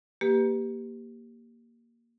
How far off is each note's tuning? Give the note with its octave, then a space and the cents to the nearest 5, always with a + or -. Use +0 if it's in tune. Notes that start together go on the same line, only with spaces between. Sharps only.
A#3 +0 G4 +0 B4 +0